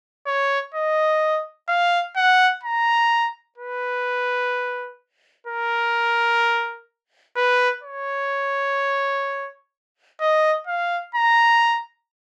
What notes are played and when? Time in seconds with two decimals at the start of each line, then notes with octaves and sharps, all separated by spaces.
0.26 C#5
0.75 D#5
1.68 F5
2.16 F#5
2.63 A#5
3.58 B4
5.47 A#4
7.36 B4
7.83 C#5
10.20 D#5
10.67 F5
11.15 A#5